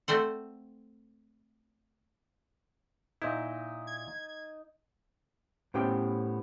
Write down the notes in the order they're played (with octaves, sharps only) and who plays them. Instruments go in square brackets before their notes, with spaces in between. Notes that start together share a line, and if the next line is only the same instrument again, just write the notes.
[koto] A3 C4 C5 F#5
[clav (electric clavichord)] A#2 E4 [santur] D#4
[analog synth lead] G#6
[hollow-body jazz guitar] A2 B3 C#4 G4 C5 G5